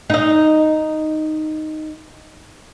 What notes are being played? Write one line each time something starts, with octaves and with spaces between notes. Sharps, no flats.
D#4 D#5